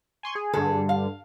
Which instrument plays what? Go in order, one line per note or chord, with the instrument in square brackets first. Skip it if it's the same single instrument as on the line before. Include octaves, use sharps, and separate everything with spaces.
[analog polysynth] G#5 C6 C#6
G#4
[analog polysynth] G2 D3 [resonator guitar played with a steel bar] G#4 A4
[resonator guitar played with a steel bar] F5